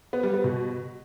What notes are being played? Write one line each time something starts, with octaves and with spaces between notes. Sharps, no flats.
B3
G3
B3
B2